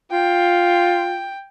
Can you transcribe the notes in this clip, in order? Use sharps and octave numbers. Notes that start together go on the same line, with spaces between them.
F4 G5